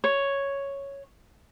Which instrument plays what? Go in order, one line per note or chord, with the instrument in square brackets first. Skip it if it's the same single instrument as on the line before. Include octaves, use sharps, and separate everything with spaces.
[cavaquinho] C#5